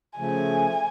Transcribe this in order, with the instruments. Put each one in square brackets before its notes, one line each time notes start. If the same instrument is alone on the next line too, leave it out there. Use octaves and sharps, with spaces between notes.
[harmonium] C#3 F3 A3 [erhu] G#5